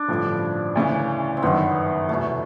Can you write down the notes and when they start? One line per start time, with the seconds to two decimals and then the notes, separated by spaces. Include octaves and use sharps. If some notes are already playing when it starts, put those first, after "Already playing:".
Already playing: D4
0.08 A1 G2 D3 F3
0.75 D2 C#3 E3
1.37 C4
1.42 G1 F#2 D#3 B3
2.09 F1 E2 B2 A3